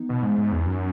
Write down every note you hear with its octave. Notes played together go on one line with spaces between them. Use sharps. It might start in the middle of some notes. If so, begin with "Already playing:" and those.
Already playing: E3 B3 D#4
B2
G#2
G#2
E2
F#2